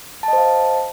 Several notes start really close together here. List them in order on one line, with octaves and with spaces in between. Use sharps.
A5 D#5 C5 F5